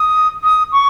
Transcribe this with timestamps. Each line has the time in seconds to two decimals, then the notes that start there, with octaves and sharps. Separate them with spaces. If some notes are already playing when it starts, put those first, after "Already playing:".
Already playing: D#6
0.43 D#6
0.72 C#6